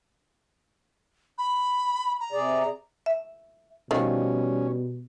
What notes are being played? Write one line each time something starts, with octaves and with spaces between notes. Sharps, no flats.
B5
A#5
C3 G#4 D5
E5
B2 D#3 F3 G3 C#4